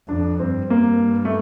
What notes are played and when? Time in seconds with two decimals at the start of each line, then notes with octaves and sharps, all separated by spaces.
0.08 F2 D4
0.39 G2 C4
0.70 A#3
1.25 A3